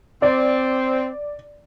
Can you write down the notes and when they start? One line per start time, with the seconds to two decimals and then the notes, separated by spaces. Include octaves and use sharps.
0.22 C4 D5